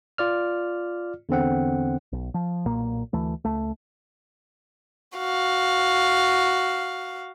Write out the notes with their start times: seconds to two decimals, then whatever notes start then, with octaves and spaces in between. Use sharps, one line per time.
0.18 F4 D5 F6
1.29 E2 D3 C4 F#5
2.12 B1
2.34 F3
2.65 B1 A#2 A#3
3.13 D2 E3 A3
3.45 C#2 A3
5.18 F#4 F5